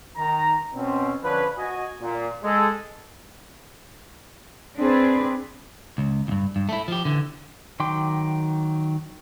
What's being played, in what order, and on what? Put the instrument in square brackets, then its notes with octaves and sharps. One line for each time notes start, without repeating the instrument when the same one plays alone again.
[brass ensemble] D#3 A#5
B2 C4 C#4
D3 F3 C#4 D4 B4
F#4 D#5 G#5
A#2
G#3 A4
[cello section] C4 D4 G#4 B4
[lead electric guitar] C#2
D2 G2
G2
A3 E4
F3 G4
D3 E3
[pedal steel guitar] D#3 F#3 G5 C6 D6